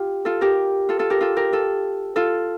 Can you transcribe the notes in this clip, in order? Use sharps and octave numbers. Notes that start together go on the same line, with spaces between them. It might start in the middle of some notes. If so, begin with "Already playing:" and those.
Already playing: F4 G4
F4 A4
G4 A#4
F4 A4
F4 A4
G4 A#4
F4 A4
G4 A#4
F4 A4
F4 A4